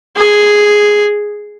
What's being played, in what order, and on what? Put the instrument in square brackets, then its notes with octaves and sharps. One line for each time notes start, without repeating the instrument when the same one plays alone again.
[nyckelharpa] G#4